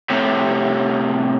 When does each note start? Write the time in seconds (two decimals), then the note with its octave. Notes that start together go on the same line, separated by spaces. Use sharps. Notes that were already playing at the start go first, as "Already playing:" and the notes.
0.10 A2 C3